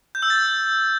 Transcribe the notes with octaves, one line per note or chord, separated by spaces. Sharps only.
G6
E6
A6